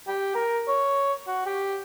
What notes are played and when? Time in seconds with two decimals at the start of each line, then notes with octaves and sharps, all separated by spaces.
0.08 G4
0.35 A#4
0.68 C#5
1.27 F#4
1.46 G4